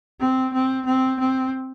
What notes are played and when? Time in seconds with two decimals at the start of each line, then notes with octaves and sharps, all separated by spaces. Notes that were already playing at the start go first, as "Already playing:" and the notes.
0.20 C4
0.53 C4
0.86 C4
1.19 C4